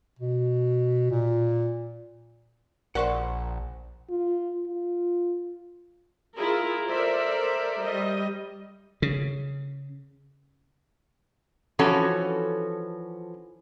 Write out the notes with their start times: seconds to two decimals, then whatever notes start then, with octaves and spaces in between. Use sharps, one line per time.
0.19 B2
1.11 A#2
2.95 A#1 A#4 C5 D5 F#5 C#6
4.10 F4
4.67 F4
6.38 E4 F4 G#4 A#4
6.89 A4 A#4 C5 D5 E5
7.81 G3 D#5
9.02 C#3
11.79 E3 F3 C#4 F#4 A4